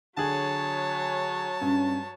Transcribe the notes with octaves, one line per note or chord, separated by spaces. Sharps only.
D3 F#3 G#4 C#5 G#5 A5
G2 C#4